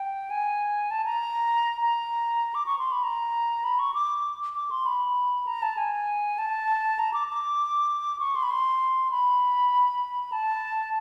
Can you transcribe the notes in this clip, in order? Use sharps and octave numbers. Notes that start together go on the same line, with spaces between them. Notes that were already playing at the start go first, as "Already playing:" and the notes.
Already playing: G5
G#5
A5
A#5
A#5
D6
C#6
C6
B5
A#5
B5
C#6
D6
D6
C6
B5
A#5
A5
G#5
A5
A#5
D6
D6
C#6
C6
B5
C6
B5
A5